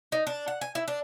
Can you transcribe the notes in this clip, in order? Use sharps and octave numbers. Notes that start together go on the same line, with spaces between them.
D#4
D4
F#5
G#5
E4
D4